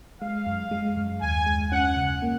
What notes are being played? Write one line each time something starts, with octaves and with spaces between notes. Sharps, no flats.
G#3 F5
F#2
G#3
F#2
D#2 G#5
G#3
C#4 F#5
C#3
A#3